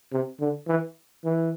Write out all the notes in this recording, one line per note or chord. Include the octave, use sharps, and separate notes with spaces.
C3
D3
E3
E3